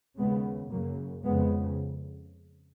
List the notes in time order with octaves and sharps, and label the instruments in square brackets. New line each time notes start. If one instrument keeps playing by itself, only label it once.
[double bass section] D#2 C#3 G#3 B3
F#2 C#3 F#3 A#3
F2 C#3 G#3 B3